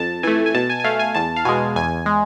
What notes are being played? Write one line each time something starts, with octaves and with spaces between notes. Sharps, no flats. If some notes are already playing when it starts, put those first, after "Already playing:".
Already playing: F2 A5
E3 A3 G#5
G#5
B2 A5
G#5
G#5
A3 F5
G#5
E2 A5
F5
B2 G#3 G#5
E2 G#5
G#3